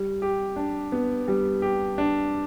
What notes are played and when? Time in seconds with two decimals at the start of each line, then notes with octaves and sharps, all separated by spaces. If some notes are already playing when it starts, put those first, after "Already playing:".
Already playing: G3
0.22 G4
0.56 D4
0.92 B3
1.28 G3
1.62 G4
1.98 D4